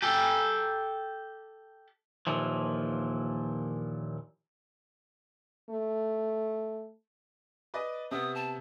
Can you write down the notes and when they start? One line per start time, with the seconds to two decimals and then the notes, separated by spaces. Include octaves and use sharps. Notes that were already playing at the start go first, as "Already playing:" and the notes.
0.02 G4 A4
2.27 D#2 A#2 E3 F3
5.70 A3
7.74 B4 D5 D#5
8.11 C3 B3 D#6
8.35 A5